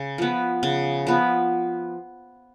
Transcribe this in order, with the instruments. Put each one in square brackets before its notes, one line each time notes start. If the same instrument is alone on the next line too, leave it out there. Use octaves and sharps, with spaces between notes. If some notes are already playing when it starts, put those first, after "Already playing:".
Already playing: [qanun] C#3
F3 B3
C#3
F3 B3